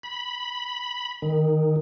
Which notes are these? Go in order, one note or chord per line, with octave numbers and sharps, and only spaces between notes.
B5
D#3